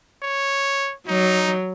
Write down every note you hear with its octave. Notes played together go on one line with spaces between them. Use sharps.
C#5
F#3 D#4